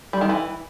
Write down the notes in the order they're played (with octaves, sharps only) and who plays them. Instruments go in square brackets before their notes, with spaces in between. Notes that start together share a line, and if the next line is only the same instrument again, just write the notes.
[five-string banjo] G3
D#3
E3